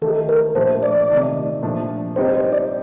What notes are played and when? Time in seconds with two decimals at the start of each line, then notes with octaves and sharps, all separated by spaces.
0.01 D#3 A3 D#4 G4 A4
0.29 A#4
0.55 A#2 F3 A3 D4 G4 C5
0.83 D5
1.09 C3 D#3 A3 D#4
1.62 A#2 F3 A3 D4
2.16 G3 C4 D#4 G4 C5
2.35 C5
2.52 D5